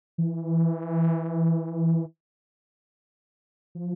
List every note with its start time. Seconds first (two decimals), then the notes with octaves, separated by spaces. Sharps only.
0.18 E3
3.75 F3